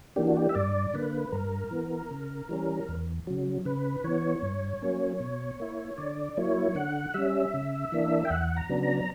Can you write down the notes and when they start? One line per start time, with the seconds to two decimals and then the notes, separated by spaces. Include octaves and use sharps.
0.16 E3 A#3 D4 G4
0.27 F#4
0.37 G4
0.49 E5
0.55 G2 D5
0.94 D3 A#3 B4
1.32 G2 A#4
1.71 E3 B3
2.11 C#3
2.49 E3 G3 C#4
2.89 E2
3.27 C#3 F#3
3.65 C#3 B4
4.04 E3 B3 C#5
4.42 G2
4.82 F#3 A#3 C#4
5.20 B2
5.60 A#3 E4
5.98 D3 D5
6.37 F#3 A#3 E4 C#5
6.75 D3 F#5
7.14 G3 C#4 E5
7.54 C#3
7.92 E3 A#3 D4
8.25 G5
8.30 E2 F#5
8.56 A#5
8.69 C#3 F#3 B3 D4
8.83 A#5